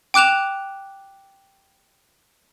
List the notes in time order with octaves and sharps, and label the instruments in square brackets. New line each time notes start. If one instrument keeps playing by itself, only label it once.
[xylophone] G5 D6 F#6 E7 F7